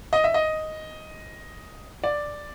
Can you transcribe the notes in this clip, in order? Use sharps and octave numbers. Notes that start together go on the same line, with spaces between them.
D#5
E5
D#5
D5